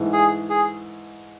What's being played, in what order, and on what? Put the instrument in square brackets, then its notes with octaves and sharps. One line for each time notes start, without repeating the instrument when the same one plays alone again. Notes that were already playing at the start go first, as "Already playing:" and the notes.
Already playing: [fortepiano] G#2 E3 A3
[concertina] G#4
G#4